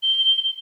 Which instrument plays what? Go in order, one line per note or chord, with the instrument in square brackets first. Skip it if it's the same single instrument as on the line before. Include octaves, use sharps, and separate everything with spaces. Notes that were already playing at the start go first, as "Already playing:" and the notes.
[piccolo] G7